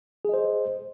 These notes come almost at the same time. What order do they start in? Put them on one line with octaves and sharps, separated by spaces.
G#4 D#5 C5